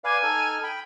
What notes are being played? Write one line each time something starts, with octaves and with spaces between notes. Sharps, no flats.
B4 D5 F5 G#5
D#4 A4 F6
G5 B5